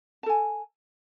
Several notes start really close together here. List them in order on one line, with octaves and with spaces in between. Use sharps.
A5 A4 G#5